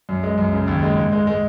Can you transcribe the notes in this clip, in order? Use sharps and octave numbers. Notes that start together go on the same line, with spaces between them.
F#2
G#3
F#2
C#3
D#2
G#3
G#2
G#3
G#3